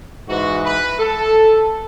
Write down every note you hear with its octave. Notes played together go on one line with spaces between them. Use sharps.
G#2 E3 F#4
B4
A4